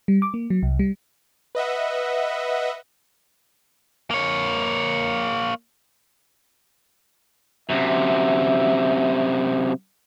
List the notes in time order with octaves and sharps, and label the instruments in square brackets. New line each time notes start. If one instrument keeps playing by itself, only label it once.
[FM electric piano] G3
D6
A#3
F#3
C2
G3
[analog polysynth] B4 D#5 E5 F#5
[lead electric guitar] A#3 C#5
[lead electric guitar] F#2 C3 [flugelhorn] E5